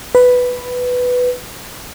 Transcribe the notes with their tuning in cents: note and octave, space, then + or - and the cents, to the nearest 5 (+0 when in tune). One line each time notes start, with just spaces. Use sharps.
B4 +5